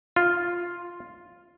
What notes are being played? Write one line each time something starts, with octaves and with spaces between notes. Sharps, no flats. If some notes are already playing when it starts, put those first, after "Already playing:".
F4